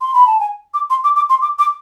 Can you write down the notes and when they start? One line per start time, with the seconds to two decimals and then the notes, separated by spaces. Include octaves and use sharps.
0.01 C6
0.14 B5
0.27 A5
0.40 G#5
0.74 D6
0.90 C6
1.04 D6
1.16 D6
1.30 C6
1.42 D6
1.59 D6